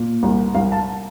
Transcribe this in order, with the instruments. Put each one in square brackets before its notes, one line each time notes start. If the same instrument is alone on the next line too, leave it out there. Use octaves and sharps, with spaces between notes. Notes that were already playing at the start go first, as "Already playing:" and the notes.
Already playing: [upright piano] A#2
C2
C2 F5
A5